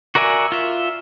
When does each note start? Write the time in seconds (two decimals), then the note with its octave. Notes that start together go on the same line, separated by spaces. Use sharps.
0.15 F#4 A#4 D5 E5 G#5
0.52 F4 E5